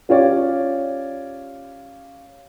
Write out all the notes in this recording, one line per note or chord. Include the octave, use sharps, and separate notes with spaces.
C#4 F4 G4 C#5 D5